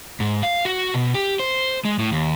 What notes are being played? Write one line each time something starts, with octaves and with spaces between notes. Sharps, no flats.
G#2
F5
F#4
B2
G4
C5
G#3
A2
D#2